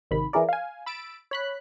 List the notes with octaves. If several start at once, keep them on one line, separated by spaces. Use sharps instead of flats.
G#1 C3 D#3 B5
E3 E4 G#4 A#4 D5
F5 G#5
B5 E6 A6 D7
C#5 B5 F#6